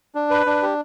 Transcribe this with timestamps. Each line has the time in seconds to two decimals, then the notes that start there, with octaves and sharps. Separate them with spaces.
0.15 D4
0.30 B4
0.46 D4
0.62 G4